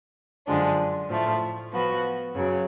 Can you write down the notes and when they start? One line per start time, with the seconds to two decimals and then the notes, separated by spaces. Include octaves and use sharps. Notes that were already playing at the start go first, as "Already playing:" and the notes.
0.47 F#2 D3 F3 G#3 D4
1.09 A2 F3 A3
1.72 F3 B3 F#4
2.34 F#2 C#3 F#3